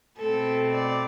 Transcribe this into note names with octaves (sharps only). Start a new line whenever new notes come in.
B2 A3 C4 A4
D5